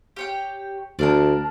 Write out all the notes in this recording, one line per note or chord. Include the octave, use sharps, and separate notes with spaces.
G4 C#5 G5
D2 D4 A#4 A5